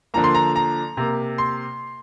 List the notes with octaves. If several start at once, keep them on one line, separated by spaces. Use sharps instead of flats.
D3 F3 A#3 A#5
C6
A#5
A#5
C3 A#3
C6